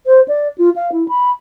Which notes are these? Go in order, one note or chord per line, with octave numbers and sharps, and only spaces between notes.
C5
D5
F4
F5
E4
B5